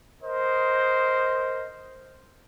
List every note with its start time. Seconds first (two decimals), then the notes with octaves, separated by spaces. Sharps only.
0.22 A#4 C5 D#5